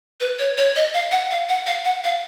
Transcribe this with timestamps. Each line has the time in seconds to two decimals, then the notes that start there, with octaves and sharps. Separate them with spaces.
0.21 B4
0.39 C#5
0.58 C#5
0.76 D#5
0.94 F5
1.12 F#5
1.31 F5
1.49 F#5
1.66 F5
1.85 F#5
2.04 F5